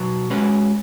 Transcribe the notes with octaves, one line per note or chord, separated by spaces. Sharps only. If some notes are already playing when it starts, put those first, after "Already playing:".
Already playing: B2 F#3 B3
G#3 C#4 F#4 B4